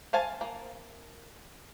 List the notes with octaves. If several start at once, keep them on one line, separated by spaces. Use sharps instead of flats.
C5 F5 G#5 A5
A#3